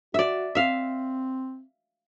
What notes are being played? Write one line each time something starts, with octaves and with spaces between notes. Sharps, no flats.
F#4 D5 E5
C4 E5 F5